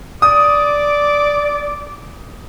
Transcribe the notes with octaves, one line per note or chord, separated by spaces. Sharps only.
D5 D6 D#6